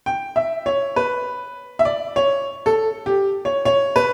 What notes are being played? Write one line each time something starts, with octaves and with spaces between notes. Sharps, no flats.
G5
E5
C#5
B4
E5
D5
C#5
A4
G4
C#5
C#5
B4